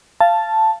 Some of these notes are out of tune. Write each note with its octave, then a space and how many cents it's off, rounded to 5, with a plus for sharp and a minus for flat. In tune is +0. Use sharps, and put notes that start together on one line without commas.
F5 -20 A5 +0